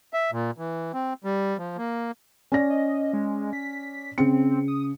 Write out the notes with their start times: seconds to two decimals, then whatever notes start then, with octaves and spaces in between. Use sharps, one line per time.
0.13 E5
0.32 A#2
0.58 E3
0.94 C4
1.24 G3
1.58 F3
1.77 A#3
2.52 C#4 D5 A#6
2.70 D#5
3.13 G#3
3.53 B6
4.18 C#3 C4 C#7
4.68 D#6